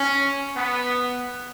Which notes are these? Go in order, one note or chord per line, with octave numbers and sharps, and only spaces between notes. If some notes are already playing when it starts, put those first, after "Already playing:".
Already playing: C#4
B3